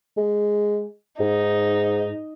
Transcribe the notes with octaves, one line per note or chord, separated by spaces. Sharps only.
G#3
G#2 D#4